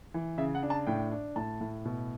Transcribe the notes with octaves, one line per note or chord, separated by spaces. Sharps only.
E3
C#3 E5
F#5
D4
A5
A2 G5
D4
A2 A5
A2
B2